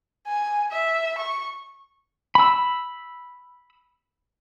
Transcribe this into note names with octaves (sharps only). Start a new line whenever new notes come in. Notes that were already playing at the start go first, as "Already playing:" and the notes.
G#5
E5
C#6
B5 E6